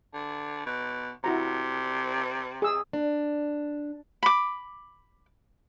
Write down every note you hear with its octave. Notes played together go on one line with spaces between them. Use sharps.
D3
B2
C3 E4 F#4 A#5
G#4 E6
D4
B5 D6